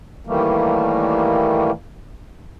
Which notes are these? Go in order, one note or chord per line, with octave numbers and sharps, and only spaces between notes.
A2 D#3 E3 G3 A3 A#3